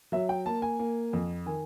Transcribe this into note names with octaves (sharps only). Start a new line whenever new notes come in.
F#3 E5
G5
A#3 A5
G#5
A#3
F2
D#3 G#5